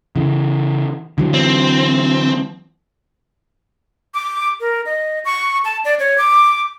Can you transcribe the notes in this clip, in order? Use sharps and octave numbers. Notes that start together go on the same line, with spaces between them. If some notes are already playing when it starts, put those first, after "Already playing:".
C#3 E3
D3 E3 F#3
C4
D6
A#4
D#5
C#6
A5
D5
C#5
D6